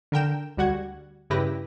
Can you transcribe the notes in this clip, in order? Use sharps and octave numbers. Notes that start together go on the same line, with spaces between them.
D3 A#4 G5 E7
D2 G3 F#4 F#5 G#6
G2 C#3 E4 G4 B4 A#6